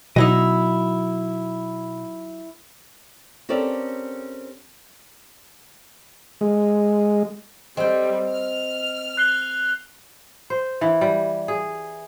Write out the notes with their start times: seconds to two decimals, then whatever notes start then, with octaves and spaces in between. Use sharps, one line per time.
0.16 B2 F#3 D#4 E4 D#5
3.49 C4 C#4 G4 A4 A#4 D5
6.41 G#3
7.77 G3 C4 D#5 G5
8.32 F6
9.17 F#6 C7 G7
10.50 C5
10.81 E3
11.01 G3
11.48 G#4